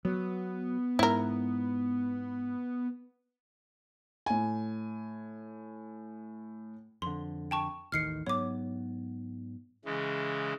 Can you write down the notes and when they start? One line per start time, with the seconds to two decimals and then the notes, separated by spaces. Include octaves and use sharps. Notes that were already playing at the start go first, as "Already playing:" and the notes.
0.05 F#3 B3
0.99 G#2 E4 A#4
4.26 A2 G#5
7.02 F2 D3 C6
7.51 G5 A5 C#6
7.92 A1 D#2 D#3 F6 C7 C#7
8.27 G#2 F#3 B3 C#5 D6
9.85 C#3 E3 G#3